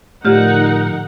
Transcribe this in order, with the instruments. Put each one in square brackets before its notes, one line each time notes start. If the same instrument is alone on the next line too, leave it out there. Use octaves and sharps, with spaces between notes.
[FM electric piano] A2 F3 [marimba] D3 G4 F6 [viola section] D#4 A#4 F#5